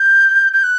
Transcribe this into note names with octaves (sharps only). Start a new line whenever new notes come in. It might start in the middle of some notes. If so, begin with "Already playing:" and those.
Already playing: G6
G6
F#6